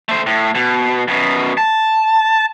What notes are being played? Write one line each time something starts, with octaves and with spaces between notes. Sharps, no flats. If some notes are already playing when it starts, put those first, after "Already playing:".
A3 C5
A2
B2
F#2 B2
A5